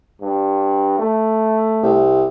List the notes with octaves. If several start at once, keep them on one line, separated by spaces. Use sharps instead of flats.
G2
A3
C2